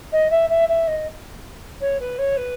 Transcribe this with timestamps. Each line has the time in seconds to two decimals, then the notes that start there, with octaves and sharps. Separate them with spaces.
0.12 D#5
0.30 E5
0.49 E5
0.68 E5
0.87 D#5
1.80 C#5
1.99 B4
2.18 C#5
2.36 B4